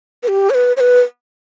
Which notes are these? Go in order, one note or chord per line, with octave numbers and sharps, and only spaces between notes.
B4
G4
C#5
B4
C#5
B4